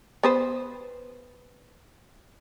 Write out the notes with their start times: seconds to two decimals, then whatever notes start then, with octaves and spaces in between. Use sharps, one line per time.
0.23 B3 B4 C5